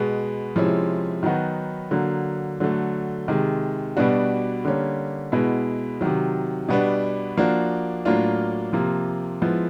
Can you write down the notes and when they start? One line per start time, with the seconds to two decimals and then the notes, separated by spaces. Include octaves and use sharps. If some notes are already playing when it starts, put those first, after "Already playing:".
Already playing: B2 G#3 B3
0.56 C3 F3 G#3 C#4 E4
1.23 D#3 F#3 B3 D#4 F#4
1.91 D3 F#3 A#3
2.60 D3 F#3 A3
3.28 C3 D#3 G#3
3.97 B2 G3 B3 D4 F#4
4.65 D3 G3 A#3 C#4
5.32 B2 G#3 B3 E4
6.01 C3 D#3 F#3
6.68 B2 G3 B3 D4
7.37 F3 A#3 D4 F#4
8.05 A2 F#3 A#3 D4 F4
8.73 C3 F3 A#3
9.42 F3 G#3 B3 E4